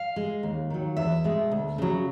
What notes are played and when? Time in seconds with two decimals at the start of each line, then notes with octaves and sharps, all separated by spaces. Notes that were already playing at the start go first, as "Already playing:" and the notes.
Already playing: F5
0.16 G#3
0.43 D#2
0.70 D#3 F#3
0.96 E2 E5
1.24 B2 G#3
1.51 D2
1.78 C#3 F#3